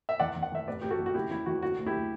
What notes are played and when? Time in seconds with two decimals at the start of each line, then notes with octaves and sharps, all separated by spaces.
0.09 E5
0.19 E2 D5 F#5
0.36 E2
0.42 F#5
0.52 E2 E5
0.67 A1 B4 D5
0.81 A1 G4
0.91 F#4 A4
0.98 A1
1.06 F#4
1.14 C#3 E4 G4
1.31 E2 E4
1.46 E2 F#4
1.62 D3 F#4
1.78 D2
1.86 E4 G4
1.93 D3